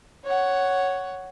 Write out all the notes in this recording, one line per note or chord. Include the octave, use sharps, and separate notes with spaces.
C#5 F#5